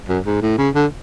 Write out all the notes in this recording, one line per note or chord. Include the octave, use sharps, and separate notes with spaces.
F#2
G#2
A2
C#3
D3